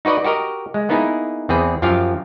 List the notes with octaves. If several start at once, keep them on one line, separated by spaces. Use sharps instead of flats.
D#4 F#4 B4 D5 D#5
F#4 G4 A#4 D#5
G#3
A#3 B3 D#4 E4 G#4
E2 C4 G#4 B4
F#2 F3 F4 G4 F5